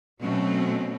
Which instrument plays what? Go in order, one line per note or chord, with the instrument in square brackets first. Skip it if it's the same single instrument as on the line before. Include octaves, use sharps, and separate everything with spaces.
[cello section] B2 F#3 A3 C4 C#4